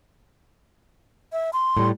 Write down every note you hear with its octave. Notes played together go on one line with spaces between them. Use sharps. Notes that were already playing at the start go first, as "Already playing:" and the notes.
E5
C6
A2 G3